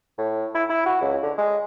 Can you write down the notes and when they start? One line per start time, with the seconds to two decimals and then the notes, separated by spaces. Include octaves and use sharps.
0.18 A2
0.55 E4
0.70 E4
0.86 F#4
1.01 C#2
1.23 D3
1.38 G#3